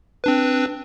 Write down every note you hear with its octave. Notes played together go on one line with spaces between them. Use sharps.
C4 D4 B4